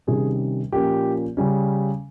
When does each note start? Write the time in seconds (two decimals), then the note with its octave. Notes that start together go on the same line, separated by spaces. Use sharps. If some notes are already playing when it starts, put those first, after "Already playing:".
0.07 C3 D#3 G3 C#4 G#4
0.72 A#2 F3 A#3 C#4 G4
1.37 C#3 G3 C#4